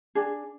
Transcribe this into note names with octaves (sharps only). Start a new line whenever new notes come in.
D4 G#4